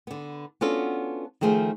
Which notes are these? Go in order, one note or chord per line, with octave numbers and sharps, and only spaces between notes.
D3 B3
B3 C#4 D4 F4 F#4 A4
D#3 F3 A3 G#4 C5